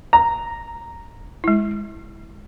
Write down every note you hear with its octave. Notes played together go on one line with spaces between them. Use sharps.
A#5
G#3 E4